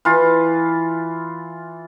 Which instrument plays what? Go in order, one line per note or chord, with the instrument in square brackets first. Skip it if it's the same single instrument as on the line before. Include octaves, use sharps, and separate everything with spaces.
[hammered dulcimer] E3 F4